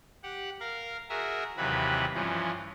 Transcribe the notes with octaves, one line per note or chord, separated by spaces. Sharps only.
G4 F#5
A#4 F5
F#4 G#4 A#4 E5
D#2 C3 E3 F#3 B4
G2 E3 F3 C#4